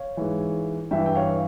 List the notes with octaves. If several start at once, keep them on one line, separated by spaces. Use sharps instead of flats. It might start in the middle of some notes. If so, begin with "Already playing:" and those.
Already playing: C#5 F5
G#2 E3
G2 E3 E5 G5
G5
C#5 F5